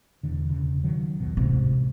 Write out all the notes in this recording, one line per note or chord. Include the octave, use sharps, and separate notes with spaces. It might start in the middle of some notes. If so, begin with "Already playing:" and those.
E1 E2 D3
E1 C#3
D#3 F#3
A#1 D#2 B2
A1 G#2 C3